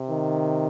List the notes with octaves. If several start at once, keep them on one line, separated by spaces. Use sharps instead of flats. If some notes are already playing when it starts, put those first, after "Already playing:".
Already playing: C3
D#3